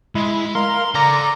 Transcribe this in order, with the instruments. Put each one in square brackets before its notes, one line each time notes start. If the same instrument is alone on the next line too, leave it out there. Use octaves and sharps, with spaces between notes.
[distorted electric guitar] G#3 [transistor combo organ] E4
[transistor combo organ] A#4 F5 [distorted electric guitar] C6
[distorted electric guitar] A4 F#5 [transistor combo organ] D5 [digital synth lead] A#5